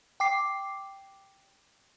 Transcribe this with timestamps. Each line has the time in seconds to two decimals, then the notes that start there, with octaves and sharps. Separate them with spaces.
0.20 G5 D6 C7